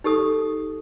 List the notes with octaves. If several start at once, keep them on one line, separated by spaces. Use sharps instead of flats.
D#4 G4 A4 D#6